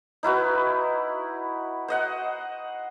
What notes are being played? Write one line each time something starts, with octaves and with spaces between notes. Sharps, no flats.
D#4 E4 F#4 B4
C5 D#5 F#5